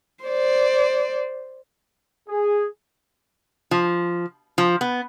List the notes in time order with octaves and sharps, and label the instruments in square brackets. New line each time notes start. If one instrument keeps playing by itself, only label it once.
[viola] C5 D5
[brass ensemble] G#4
[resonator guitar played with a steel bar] F3
F3
B3